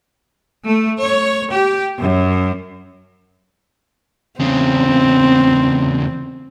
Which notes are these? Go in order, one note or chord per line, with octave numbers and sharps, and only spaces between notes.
A3
C#5
G4
F#2
E2 C#3 C4